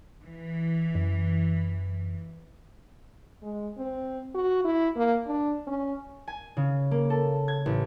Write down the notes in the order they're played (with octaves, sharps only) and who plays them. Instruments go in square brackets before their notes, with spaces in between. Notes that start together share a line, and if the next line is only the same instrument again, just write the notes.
[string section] E3
[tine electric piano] F#2
[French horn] G#3
C4
F#4
E4
A#3
D4
C#4
[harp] G#5
C#3
A#3
A4
G#6
A1